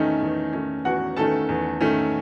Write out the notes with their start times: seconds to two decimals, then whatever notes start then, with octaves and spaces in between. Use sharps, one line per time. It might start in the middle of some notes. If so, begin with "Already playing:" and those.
Already playing: E2 D#3 A3 C#4 D#4
0.21 E2
0.53 D#3 A3 C#4
0.85 E2 F#4 F#5
1.17 D#3 A3 C#4 A4 A5
1.49 E2
1.81 D#3 A3 C#4